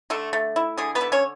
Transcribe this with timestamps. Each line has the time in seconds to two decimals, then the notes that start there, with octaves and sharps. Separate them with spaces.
0.10 D3 A3 A4
0.33 A3
0.56 E4
0.77 D3 G#4
0.95 B3 B4
1.01 D3
1.12 C#4 C#5